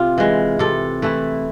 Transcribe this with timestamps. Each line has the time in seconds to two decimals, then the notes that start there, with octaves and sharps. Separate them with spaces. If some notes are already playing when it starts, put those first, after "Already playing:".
Already playing: C3 F4
0.18 E3 G#3
0.59 C3 A4
1.02 E3 A3 E4